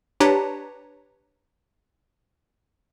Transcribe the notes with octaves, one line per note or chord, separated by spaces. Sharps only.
D4 G4 B4 C#5 A5 A#5